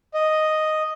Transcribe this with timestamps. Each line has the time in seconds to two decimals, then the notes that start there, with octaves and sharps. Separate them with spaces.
0.14 D#5